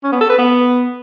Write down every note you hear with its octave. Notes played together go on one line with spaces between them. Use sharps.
C#4
B3
A4
B4
B3